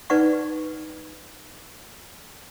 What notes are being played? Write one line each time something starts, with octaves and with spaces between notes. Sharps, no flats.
D#4 B4 D5 F#5 C#6